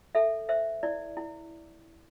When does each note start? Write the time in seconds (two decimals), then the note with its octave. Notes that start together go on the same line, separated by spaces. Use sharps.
0.15 A4 E5
0.49 C5 E5
0.83 E4 D5
1.17 E4